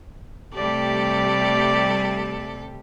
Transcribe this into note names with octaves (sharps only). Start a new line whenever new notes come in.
C3 G3 A3 G4 A4 D5